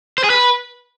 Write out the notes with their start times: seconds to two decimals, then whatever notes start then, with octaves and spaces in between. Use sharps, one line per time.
0.18 C5
0.24 G#4
0.30 B4